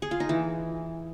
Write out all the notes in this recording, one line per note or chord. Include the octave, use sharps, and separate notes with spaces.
G#4
F4
D#4
E3